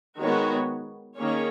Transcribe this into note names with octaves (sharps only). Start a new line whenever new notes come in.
D#3 G#3 B3 F#4 C#5
D#3 A#3 C#4 G#4 C#5